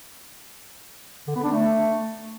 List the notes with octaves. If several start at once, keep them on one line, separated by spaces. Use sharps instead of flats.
D3
B3
D4
A3